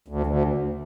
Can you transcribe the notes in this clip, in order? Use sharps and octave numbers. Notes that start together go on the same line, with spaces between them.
D2
D2